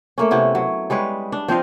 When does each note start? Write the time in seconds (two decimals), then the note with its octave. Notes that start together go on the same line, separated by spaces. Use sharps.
0.18 A3 A#3 C#4
0.31 C3 B3 C#4 E4
0.55 F#3
0.90 G3 G#3 B4 C#5
1.32 D4
1.48 F3 C4 D#5 F5